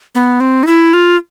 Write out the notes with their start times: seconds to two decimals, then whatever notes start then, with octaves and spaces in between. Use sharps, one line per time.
0.15 B3
0.40 C4
0.63 D#4
0.67 E4
0.93 F4